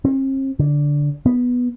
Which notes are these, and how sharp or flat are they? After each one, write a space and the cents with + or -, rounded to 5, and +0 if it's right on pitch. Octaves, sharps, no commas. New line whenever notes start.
C4 +45
D3 -10
B3 -5